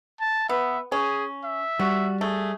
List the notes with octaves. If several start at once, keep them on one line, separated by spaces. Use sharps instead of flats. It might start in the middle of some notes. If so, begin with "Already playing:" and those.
A5
B3 E5
C#4 G#4
E5
G3 F#4
A3 G#4